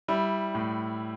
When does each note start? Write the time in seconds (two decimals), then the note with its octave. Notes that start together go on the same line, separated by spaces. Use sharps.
0.08 G3 E4
0.55 A2